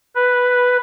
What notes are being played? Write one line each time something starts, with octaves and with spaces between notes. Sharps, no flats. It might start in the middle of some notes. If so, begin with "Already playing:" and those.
B4